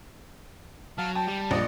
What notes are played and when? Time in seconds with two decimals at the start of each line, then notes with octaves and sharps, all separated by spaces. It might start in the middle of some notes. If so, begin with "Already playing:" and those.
0.98 F#3 F5 A5 F6
1.15 G5 A5
1.28 G3
1.51 A#1 D5 D#5